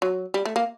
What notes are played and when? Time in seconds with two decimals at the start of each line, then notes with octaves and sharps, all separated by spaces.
0.02 F#3
0.34 G3
0.45 A3
0.56 A#3